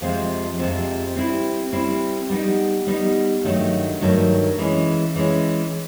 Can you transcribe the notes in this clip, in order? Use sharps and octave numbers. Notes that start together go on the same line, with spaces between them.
F2 C3 F3 G#3 C4
F2 C3 F3 G#3 C4
G3 C4 E4
G3 C4 E4
G3 B3 D#4
G3 B3 D#4
G2 D#3 F#3 A3
G2 D#3 F#3 A3
E3 G#3 C#4
E3 G#3 C#4